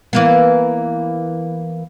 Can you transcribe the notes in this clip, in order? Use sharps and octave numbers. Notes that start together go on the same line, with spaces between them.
E3 A#3 B3